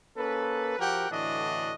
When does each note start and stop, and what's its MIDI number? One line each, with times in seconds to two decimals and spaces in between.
0.17 0.76 58
0.17 0.76 61
0.17 0.76 69
0.17 0.76 71
0.79 1.10 53
0.79 1.10 66
0.79 1.10 67
0.79 1.10 70
0.79 1.10 78
0.79 1.10 79
1.11 1.72 45
1.11 1.72 50
1.11 1.72 52
1.11 1.72 62
1.11 1.72 66
1.11 1.72 75